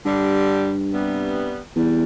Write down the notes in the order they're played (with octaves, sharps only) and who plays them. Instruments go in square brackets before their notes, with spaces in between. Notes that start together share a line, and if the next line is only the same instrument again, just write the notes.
[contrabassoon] G2 [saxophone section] D3 G3 D4 G4
[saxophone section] C3 G3 B3
[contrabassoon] E2 [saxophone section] C3 E3 G3